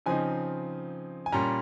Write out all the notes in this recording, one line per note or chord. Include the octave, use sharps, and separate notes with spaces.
C#3 F3 C4 D#4 G#5
G#5
A#2 G3 C#4 A#5